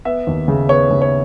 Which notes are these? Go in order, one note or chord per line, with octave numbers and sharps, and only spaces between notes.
B3 E5
D#2
C#3
B3 C#5
C#3
C#5